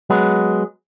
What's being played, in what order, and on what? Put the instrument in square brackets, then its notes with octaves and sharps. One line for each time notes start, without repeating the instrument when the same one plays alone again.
[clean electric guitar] F#3 G#3 B3